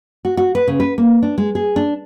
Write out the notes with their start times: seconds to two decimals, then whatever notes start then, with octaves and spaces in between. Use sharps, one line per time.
0.25 F#4
0.37 F#4
0.55 B4
0.68 C#3
0.80 B4
0.98 A#3
1.23 D4
1.38 G#3
1.55 G#4
1.76 D4